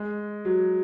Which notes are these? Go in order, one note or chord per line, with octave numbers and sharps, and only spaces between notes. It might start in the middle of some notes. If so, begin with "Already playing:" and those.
Already playing: G#3
F#3